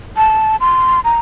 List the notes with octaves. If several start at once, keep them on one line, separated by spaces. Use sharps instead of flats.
A5
C6
A#5